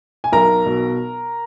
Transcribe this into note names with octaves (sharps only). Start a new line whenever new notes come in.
G#5
B1 A#4 A#5
B2